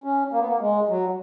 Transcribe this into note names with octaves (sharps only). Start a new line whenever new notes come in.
C#4
A#3
B3
A#3
G#3
F#3